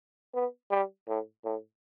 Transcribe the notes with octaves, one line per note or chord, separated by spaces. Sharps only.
B3
G3
A2
A2